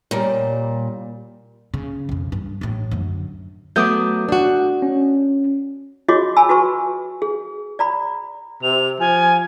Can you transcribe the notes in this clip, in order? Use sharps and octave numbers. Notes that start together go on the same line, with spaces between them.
A#2 G3 A#4 C#5
C#3
B1 F2
G2
A1 A2
F#2 D3
F#3 A3 B3 D6 D#6 G6
D4 F#4
C#4
F4 F#4 G#4 C#5 D#5 D6
G#5 A5 B5 E6
F#4 B4 A5 C#6
G#4
D5 A#5 B5
C3 F7
F3 G#5